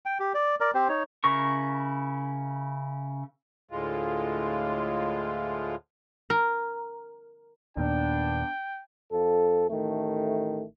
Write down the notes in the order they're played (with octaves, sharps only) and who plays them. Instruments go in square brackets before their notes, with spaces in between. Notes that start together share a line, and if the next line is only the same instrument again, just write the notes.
[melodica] G5
G4
D5
A#4 D5
C4 G4 C5
D#4 C#5
[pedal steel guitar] C#3 E4 A#4 C#6
[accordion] D2 A2 G#3 F4
[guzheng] A#4
[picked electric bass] D#2 A#2 [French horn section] B3 D4 [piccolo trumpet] G5
[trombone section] F2 A4
A1 D#3 A3